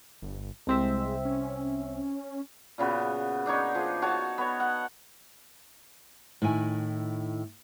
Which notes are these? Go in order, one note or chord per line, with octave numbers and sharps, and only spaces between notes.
G1
C2 G#3 C4 E5
C#4
A#2 C#3 B3 F#4
D4 D#4 C#5 D#5
F3 G#4
F#4 C#5 A5
B3 C#5
F#5
A2 D#3 E4 G#5